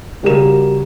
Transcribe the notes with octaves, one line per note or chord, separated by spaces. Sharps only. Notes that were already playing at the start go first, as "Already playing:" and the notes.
C#3 G3 F#4 G4 A#4 E7